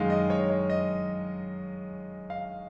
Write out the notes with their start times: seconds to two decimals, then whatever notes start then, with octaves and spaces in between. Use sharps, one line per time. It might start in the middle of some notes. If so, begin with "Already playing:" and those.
Already playing: F#2 D#3 G#3 F5
0.10 D#5
0.30 C#5
0.50 C#5
0.70 D#5
2.30 F5